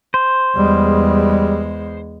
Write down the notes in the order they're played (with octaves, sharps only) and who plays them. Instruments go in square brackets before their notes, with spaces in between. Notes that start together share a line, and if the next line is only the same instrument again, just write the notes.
[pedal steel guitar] C5
[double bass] E2 G#3 [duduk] G3